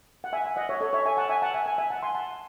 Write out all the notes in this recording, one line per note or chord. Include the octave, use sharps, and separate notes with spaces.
F#5
E5 G#5
E5 G#5
D#5 F#5
C#5 E5
A4 C#5
C#5 E5
E5 G#5
F#5 A5
E5 G#5
F#5 A5
E5 G#5
E5 G#5
E5 G#5
F#5 A5
G#5 C6
F#5 A5